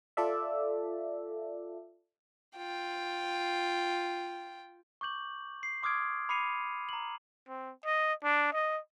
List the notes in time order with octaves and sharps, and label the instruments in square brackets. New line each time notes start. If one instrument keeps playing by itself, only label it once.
[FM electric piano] F4 A4 D5 E5
[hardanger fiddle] F4 G5
[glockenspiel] C#6 D6 G6 F#7
C7
C6 D6 D#6 F6 G#6 D7
B5 D6 C7 C#7 D#7 F7
A#5 F#7
[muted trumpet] C4
D#5
D4
D#5